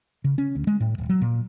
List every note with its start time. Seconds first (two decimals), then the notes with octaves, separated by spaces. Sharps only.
0.24 C#3
0.38 C#4
0.55 D2
0.67 G#3
0.80 A2
0.98 D#1
1.09 F#3
1.21 A#2